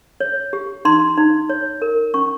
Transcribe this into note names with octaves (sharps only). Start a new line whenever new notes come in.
C#5
G4
D#4 C6
D#4
C#5
A#4
C#4 C#6